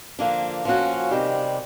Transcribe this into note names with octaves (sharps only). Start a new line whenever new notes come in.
D3 F3 A#3 D4
F3 A#3 C#4 F#4
C3 D#3 G3